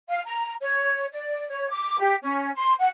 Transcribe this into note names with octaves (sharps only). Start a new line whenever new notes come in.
F5
A#5
C#5
D5
C#5
D6
G4
C#4
C6
F#5